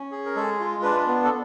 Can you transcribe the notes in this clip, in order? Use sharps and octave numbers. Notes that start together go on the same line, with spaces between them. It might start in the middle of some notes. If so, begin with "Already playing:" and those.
Already playing: C#4
G#4
A#4
G#3 A4
F4
D4 B4
B3
A4